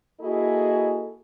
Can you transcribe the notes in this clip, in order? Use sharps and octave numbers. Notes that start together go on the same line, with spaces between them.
A#3 E4 F#4 G#4 A4 D#5